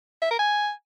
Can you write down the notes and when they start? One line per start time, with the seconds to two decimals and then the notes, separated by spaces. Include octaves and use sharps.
0.22 E5
0.31 A#4
0.39 G#5